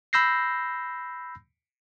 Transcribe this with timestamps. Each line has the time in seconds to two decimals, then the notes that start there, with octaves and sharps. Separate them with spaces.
0.13 B5 E6 G6 A#6 C7